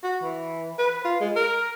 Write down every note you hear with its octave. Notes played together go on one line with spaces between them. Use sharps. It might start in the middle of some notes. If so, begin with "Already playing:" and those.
F#4
E3
B4
F4
G#3
A#4